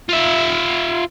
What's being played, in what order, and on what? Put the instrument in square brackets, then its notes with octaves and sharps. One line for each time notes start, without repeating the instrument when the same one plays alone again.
[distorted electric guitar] F4 E5